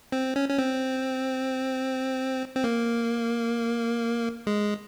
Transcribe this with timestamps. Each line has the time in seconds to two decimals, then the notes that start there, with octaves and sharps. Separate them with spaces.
0.12 C4
0.36 C#4
0.49 C#4
0.58 C4
2.56 C4
2.64 A#3
4.47 G#3